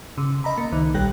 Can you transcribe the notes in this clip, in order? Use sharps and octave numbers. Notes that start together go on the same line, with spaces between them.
C#3
D#5 A#5 B5
A#3
C#2 D#3
A#1 G3 G4 G5 F#6